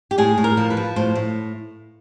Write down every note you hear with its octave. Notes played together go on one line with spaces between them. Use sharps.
G4
A2 G#4
A2
A#4
F3
B4
F3
A2 C5
A2